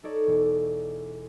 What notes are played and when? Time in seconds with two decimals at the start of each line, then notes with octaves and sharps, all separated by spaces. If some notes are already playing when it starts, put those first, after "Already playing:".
0.03 D#4 A4 C#5 D5
0.26 E1 D6